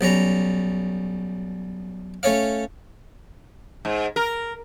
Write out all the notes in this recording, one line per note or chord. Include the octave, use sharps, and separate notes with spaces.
B1 G3 C#4 A#5
A3 C#4 C#5 F5
G#2
A#4